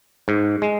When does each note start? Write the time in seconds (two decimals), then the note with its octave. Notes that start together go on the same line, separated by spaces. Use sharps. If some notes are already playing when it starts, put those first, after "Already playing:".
0.28 G#2
0.62 G#3